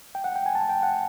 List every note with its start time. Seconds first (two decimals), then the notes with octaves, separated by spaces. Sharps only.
0.15 G5
0.24 F#5
0.36 G5
0.46 G#5
0.55 A5
0.69 G5
0.83 F#5